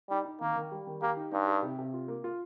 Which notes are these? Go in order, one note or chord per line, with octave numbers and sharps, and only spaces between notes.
G3 D#4
D#4
D#3 A#3
D#3
G3
D#3
A#3 G4
D#4
G2 D#4
G4
C3
C3
F4
A#3
F4